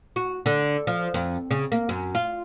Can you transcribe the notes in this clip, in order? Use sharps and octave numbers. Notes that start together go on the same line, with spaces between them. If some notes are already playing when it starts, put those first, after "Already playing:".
F#4
D3
F3
F2
C#3
A#3
F#2
F4